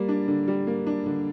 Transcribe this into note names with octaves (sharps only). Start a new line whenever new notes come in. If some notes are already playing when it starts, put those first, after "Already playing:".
Already playing: G3 A#3
D4
D3
G3
A#3
D4
D3